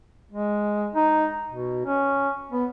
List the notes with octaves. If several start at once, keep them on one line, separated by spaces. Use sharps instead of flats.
G#3
D#4
B2
C#4
B3